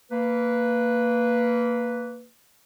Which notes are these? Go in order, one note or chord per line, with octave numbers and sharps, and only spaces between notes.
A#3 B4